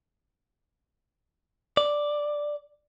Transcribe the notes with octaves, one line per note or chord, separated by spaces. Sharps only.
D5